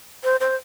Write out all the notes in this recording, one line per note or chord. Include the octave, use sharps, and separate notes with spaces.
C5
C5